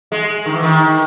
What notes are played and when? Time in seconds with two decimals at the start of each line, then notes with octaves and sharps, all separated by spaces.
0.12 G#3
0.46 D#3
0.54 E3
0.62 D#3